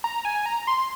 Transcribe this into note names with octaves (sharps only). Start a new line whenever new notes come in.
A#5
G#5
A#5
C6